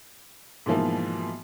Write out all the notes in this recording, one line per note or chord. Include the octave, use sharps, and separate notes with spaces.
G#2 B2 E3 F3 A#3